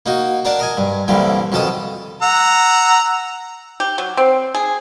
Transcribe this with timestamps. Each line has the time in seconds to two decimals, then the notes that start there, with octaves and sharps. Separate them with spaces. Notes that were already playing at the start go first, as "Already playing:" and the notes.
0.06 A#3 D#4 F#4
0.45 D4 A#4 D5 F#5 A5
0.59 A#4 D#5 G#5
0.77 G2
1.08 C2 D3 E3 G3 A#3
1.52 F2 B2 D#3 A4 A5 D#6
2.22 F#5 A#5 E6
3.80 G4
3.98 F#3
4.17 C4
4.55 G#4